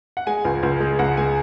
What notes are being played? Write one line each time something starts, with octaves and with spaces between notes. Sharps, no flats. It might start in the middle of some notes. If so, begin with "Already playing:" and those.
F#5
G#3 G#5
C#2
C#2
G#3
C#2 F#5
G#3 G#5